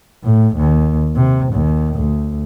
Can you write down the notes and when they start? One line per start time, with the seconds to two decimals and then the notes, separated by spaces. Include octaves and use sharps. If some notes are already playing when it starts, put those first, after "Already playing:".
0.23 A2
0.57 D#2
1.16 C3
1.53 D#2
1.95 D2